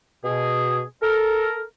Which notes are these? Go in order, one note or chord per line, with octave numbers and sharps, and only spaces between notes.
B2 G#4
A4 A#4